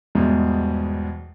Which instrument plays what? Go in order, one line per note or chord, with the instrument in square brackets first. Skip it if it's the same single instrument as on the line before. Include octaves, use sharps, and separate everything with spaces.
[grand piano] E2 G#2 B2 G3 G#3